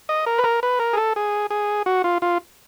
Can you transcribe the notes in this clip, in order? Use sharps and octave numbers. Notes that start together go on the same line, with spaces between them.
D#5
A#4
B4
A#4
B4
A#4
G#4
A4
G#4
G#4
F#4
F4
F4